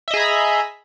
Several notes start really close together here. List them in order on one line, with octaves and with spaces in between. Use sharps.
E5 D#5 G#4 A#5 B5